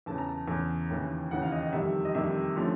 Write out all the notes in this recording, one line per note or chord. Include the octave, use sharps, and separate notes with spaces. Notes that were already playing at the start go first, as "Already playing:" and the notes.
E2 C#3 E3 A5
A#5
A5
E2 C#3 E3
D#2 C#3 E3
D#2 C#3 E3 F#5
F5
D#5
D#5
F2 C3 D#3 G3 E5
D#5
F2 C3 D#3 G3 E5
D3 F3 A3 C#4